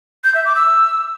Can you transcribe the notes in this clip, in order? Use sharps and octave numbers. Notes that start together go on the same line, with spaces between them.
G6
E5
D6
E6